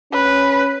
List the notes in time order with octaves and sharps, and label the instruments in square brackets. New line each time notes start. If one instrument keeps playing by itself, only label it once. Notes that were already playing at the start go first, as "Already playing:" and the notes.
[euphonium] C#4 [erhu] B4